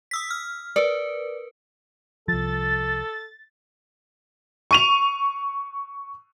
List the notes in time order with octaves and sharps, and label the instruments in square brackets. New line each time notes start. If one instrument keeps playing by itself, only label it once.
[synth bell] D#6 E6 B6
F6
[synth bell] A#4 B4 [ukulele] D5
[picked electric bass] C2 F3 [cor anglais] A4 [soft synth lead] A6
[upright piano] C#6 D#7 F7